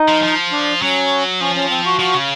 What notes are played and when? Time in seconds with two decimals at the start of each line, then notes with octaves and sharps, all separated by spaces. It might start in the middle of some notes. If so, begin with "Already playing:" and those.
Already playing: D#4
0.08 F3
0.23 F3
0.52 D4
0.82 F#3 C#4
1.41 F3 C#4
1.55 C#4
1.70 C4
1.85 F#4
2.00 F3
2.14 C#3